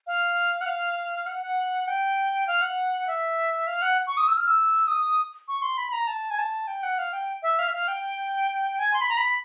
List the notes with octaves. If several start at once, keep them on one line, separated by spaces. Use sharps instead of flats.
F5
F#5
F5
F#5
F#5
G5
F5
F#5
E5
F5
F#5
C#6
D#6
E6
F6
E6
D#6
C#6
C6
B5
B5
A#5
A5
G#5
A5
G5
F#5
F5
G5
E5
F5
E5
F5
G5
G#5
C6
B5
A#5
B5